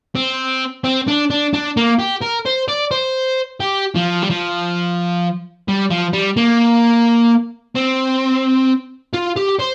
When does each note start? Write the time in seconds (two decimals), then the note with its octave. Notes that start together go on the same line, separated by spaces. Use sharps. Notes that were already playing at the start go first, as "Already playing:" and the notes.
0.15 C4
0.84 C4
1.08 D4
1.30 D4
1.54 D4
1.77 A#3
1.99 G4
2.22 A#4
2.46 C5
2.68 D5
2.91 C5
3.60 G4
3.95 F3
4.22 G3
4.30 F3
5.69 G3
5.91 F3
6.13 G3
6.37 A#3
7.75 C4
9.13 F4
9.36 G4
9.59 C5